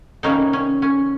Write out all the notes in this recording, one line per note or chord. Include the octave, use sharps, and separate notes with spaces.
C3 D#3 G3 A#3 C#4 D#4
C#4
C#4